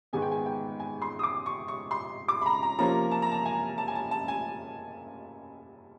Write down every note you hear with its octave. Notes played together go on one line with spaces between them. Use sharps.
G#2 D#3 G#3 B3 G#5
G5
G#5
G5
G#5
C6
D#6
D6
C#6
C#6
C6
D6
B5
A#5
A#5
C3 F3 A#3 C#4 A#5
A5
A#5
A5
G#5
A5
G#5
A5
A5
G#5